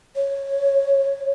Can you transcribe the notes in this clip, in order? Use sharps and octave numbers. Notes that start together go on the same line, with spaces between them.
C#5